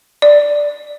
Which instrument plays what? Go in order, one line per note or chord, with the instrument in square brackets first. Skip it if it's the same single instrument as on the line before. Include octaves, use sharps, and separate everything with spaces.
[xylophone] D5